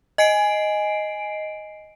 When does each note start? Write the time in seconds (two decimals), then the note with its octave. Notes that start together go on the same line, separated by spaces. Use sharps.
0.18 D#5 G#5 C7 D7